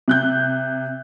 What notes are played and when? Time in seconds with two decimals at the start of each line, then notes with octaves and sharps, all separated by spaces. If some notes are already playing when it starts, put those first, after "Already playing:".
0.08 C3 F#6 G6